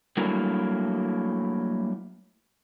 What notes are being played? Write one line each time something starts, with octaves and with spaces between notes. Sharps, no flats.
F#3 G3 A3 A#3 D4 E4